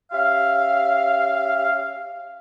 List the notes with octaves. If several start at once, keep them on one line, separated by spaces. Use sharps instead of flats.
C#4 G4 E5 F5